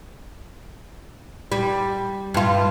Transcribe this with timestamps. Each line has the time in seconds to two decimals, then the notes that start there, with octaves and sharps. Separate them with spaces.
1.52 G3
2.34 G2 F4